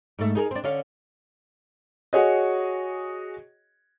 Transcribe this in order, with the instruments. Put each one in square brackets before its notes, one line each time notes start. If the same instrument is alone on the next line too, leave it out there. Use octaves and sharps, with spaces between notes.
[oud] G#2 A3
D#4 G#4 A#4
C4 D4
D3 C#4 F5
[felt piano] F#4 G#4 C#5 D#5